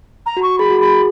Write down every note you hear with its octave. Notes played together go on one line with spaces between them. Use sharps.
A#5
F#4
C#6
G#4 B5
F#4
G#4 B5